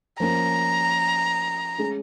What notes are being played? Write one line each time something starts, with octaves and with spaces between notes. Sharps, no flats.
F3 A#3 C#4 A#4 A#5
G#3 C#4 G#4